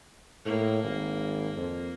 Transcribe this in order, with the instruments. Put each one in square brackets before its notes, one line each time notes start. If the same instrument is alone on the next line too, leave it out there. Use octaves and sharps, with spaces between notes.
[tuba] A2 [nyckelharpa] A#3
[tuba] G#1
F2